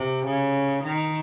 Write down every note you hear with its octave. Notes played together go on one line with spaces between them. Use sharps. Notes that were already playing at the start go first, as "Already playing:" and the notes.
Already playing: C3
C#3
D#3